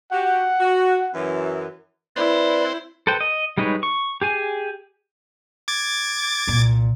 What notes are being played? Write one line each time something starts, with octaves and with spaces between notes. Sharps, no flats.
F#4 G4 F#5
F#4
F#2 E3
C4 E4 B4 C5 D5 B5
A4 B4 C5 G5
D#5
G3 G#3 D#4 B4 C#5
C#6
G4 G#4 G#5
D6 G#6 A6
C2 A#2